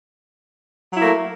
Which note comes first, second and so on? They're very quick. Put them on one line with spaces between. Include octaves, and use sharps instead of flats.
F#3 E4 A#3 A3